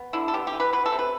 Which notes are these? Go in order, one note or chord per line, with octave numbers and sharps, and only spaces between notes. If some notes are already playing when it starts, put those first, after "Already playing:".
Already playing: B3
D3 E4
A4
B3 G4
G4
E3
B4
F#3 B4
A4
C3
B4